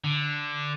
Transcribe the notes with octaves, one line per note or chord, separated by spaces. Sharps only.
D3